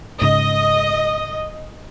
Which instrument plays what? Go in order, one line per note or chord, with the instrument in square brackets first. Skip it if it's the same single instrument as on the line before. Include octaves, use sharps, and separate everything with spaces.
[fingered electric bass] G#2 C#3 [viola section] D#5